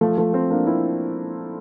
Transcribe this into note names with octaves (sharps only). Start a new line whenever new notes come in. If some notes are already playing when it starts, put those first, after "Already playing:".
F3 A3
F3 A3
A3 C4
A#3 D4
C4 E4